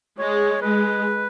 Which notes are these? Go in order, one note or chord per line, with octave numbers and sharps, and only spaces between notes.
G#3 C#5
G#3 B4